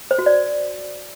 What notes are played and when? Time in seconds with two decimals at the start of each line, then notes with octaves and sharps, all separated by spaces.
0.11 C5
0.19 F#4
0.26 D5